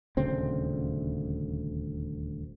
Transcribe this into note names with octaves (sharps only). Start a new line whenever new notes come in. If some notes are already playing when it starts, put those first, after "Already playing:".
D#1 D2 C#3 C4